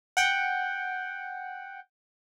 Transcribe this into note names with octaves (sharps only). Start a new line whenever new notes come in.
F#5 G5